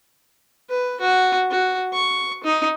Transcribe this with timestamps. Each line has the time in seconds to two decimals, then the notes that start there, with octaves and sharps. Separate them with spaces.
0.70 B4
1.01 F#4
1.51 F#4
1.93 C#6
2.44 D#4